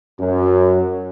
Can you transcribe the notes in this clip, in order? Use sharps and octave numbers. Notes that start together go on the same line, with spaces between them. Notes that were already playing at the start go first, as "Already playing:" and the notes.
F#2